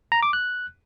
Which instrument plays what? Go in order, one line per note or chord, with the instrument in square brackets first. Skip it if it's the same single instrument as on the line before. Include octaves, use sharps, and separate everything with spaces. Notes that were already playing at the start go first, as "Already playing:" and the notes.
[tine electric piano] A#5
D6
F#6